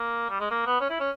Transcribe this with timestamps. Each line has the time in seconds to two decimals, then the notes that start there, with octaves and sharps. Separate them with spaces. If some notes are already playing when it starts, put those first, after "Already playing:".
Already playing: A#3
0.30 G3
0.40 G#3
0.51 A#3
0.66 B3
0.80 C#4
0.90 E4
1.00 C#4